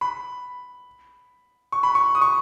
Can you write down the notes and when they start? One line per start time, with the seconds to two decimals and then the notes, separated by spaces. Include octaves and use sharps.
0.01 B5
1.72 C#6
1.83 B5
1.95 C#6
2.15 D#6
2.22 C#6